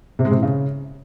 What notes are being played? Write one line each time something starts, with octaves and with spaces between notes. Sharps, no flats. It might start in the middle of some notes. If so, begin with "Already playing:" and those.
C3
G#3
C3
E3
C#3